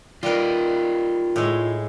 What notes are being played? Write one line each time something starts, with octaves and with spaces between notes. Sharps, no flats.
G3 D#4 F4 A#4 B4
A2 G#3